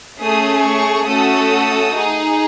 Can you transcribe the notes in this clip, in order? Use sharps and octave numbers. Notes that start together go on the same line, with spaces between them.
A3 C#4 G#4 D#6
C#6
A3 C#4 F#4 A4 D#6
D#4 G#4